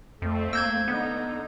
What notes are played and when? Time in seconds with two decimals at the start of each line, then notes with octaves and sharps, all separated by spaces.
0.22 F2 A3 C4
0.53 A#3 E6 G6 G#6
0.88 D3 B3 D#4